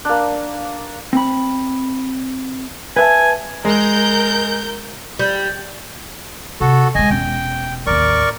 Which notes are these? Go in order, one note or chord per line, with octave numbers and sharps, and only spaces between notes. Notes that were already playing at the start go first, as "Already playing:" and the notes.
A#3 D4
C4 B5
B4 E5 G#5 A5
G#3 A#4 G6
G3
C3 F#4 A4
D3 G#3 D#5 G#5
E1 C#4 G5
A1 D#2 A#4 D5 C#6